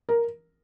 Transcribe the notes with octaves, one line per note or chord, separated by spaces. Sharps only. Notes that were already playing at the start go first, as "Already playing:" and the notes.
A#4